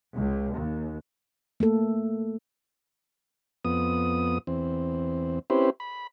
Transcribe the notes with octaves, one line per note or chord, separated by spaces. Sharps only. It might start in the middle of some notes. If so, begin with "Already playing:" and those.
C#2
D#2
A3 A#3 A4
F2 B3 D#6
E2 C4
C4 C#4 E4 G4 B4 C5
B5